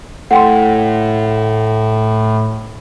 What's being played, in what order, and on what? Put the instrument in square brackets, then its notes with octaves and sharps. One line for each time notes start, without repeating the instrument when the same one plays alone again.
[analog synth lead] A2 [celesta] F#5 G5 C6